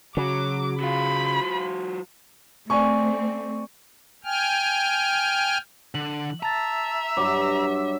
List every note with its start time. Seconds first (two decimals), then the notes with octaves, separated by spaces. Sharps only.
0.17 C#3 F#3 D6
0.81 F#3 F4 B5
2.70 A3 C4 D5 G#5 C#6
4.25 G5 G#5 F6
5.95 D3 F#7
6.43 E5 A5 A#5 A6
7.17 G2 F#3 D6